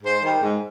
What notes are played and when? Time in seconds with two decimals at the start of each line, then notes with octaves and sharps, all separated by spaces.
0.03 G#2 C5
0.22 D#3 G3
0.41 G#2